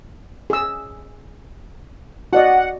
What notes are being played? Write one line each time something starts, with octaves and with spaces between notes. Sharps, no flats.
G#4 E6
F#4 D5 D#5 F#5